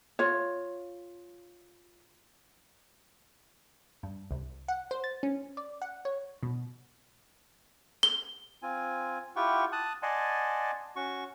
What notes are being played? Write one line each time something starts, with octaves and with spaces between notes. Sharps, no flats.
F4 C#5
G2
C2
F#5
C5
A6
C#4
D5
F#5
C#5
B2
G7
C4 F4 G#5
E4 F4 G4 F#5 G5 C#6
A5 D#6 F#6
D5 D#5 F#5 G#5 A5 C6
C#4 F#4 C#6